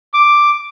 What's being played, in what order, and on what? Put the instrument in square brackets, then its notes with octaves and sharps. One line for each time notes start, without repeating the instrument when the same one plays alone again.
[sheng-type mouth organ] D6